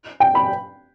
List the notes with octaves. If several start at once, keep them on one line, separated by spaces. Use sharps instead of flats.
G5
B5